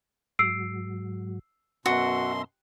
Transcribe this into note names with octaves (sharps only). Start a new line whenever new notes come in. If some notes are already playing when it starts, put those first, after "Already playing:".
G#2 F#3 E6 C7 D7
F#2 B2 B3 F#4 E5 A#5 C6